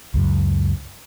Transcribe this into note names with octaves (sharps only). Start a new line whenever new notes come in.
C#2 F#2